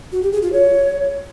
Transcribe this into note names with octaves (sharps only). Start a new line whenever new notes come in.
F#4
G4
G#4
F4
C#5